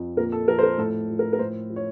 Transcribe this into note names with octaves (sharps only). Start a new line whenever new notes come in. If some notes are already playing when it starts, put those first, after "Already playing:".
Already playing: F2
A#2 A#4
A4
F3 A#4
C5
A#4
A2 A4
F3
A#4
A#4
A2 C5
F3
C#5